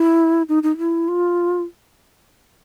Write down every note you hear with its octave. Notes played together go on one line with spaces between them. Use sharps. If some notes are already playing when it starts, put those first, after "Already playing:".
Already playing: E4
D#4
D#4
E4
F4